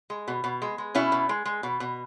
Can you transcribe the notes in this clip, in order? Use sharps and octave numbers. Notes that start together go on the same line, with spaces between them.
G#3
B2
B2
G#3
G#3
B2 C#4 E4
B2
G#3
G#3
B2
B2